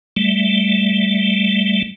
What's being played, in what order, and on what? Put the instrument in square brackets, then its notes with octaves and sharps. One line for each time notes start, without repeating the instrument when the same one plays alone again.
[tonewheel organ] G3 A3